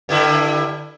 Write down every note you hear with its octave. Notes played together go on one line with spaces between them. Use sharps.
G2 D3 E4